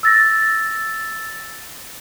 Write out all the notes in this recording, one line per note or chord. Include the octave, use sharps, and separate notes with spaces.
E6 A6 A#6